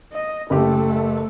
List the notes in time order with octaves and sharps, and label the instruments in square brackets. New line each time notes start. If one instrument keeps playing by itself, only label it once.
[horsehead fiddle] D#5
[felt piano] F#1 G4 [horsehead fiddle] A3